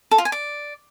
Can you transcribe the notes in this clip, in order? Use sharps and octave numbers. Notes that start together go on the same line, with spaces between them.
A4
F4
G#5
D5